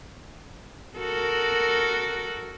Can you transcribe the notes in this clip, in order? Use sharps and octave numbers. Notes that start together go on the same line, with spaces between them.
F#4 A4 A#4